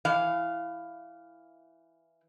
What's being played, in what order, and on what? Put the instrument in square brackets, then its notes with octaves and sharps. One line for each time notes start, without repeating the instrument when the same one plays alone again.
[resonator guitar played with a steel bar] E3 F5